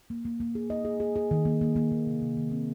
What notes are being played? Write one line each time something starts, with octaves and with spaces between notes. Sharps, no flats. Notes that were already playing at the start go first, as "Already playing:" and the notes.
A#3
A#3
A#3
G#4
D#5
G#4
G#4
G#4
D#3
A#3
A#3
A#3
D#3
C3
C3
D#3
C4